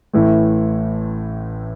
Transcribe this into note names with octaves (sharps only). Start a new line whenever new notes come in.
A1 A2 E3 A3